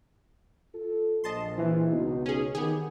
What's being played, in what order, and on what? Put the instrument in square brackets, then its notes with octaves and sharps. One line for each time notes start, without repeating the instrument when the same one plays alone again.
[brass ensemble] F4 A4
[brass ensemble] A#1 [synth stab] D#5 A5 C6
[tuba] E3
[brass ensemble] C#2 D#4 [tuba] B2
[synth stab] C#4 G#4
[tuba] D#3 [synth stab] B3 G4 G#4